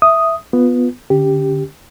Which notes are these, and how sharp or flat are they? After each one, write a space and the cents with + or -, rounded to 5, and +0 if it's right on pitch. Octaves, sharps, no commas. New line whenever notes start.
E5 +0 D#6 +0
B3 +0 F4 +15
D3 +0 C#4 +25 G4 +0